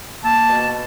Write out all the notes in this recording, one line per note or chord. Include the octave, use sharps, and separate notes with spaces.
A#3 A5
B2